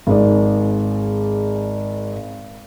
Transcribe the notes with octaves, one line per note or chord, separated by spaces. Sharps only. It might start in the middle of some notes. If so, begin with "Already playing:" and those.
G#1 G#4 D5